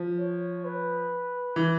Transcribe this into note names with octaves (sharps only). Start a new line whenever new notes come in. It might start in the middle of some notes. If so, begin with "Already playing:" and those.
Already playing: F3
C#5
B4
E3